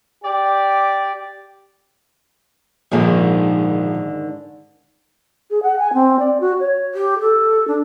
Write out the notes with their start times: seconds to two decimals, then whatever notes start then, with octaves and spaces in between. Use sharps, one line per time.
0.23 G4 D5
2.92 A#1 G#2 D3 D#3
5.51 G#4
5.63 F#5
5.79 G#5
5.94 C4
6.19 D5
6.40 F#4
6.60 C#5
6.94 G4
7.20 A4
7.68 D4